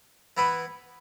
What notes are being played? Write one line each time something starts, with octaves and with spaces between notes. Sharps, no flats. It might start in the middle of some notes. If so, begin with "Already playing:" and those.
E3 B3 E4 B4 E5